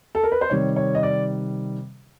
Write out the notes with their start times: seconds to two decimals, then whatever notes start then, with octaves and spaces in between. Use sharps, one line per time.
0.15 A4
0.23 A#4
0.32 B4
0.41 C5
0.50 C3 D#3 G3 C#5
0.76 C#5
0.95 D#5
1.03 D5